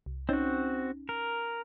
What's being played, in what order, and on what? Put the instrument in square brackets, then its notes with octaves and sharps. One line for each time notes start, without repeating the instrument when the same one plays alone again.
[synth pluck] C2
[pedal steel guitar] C4 F#4 [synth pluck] C#4 D#4
[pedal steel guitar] A#4